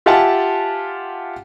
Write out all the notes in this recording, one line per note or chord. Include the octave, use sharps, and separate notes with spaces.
F4 G4 E5 F#5 G#5 A5